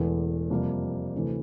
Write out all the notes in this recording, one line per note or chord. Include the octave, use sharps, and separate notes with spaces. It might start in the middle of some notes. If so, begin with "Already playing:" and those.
Already playing: E1 E2 E3 A3
F2 C3 G3 A#3
D2 C3 E3 A3